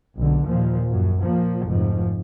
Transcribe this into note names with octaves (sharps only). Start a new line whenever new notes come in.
B1 D3
D#2 A#2 F3
A#1 F#2
A#2 F3 A#3
F1 G#2 F3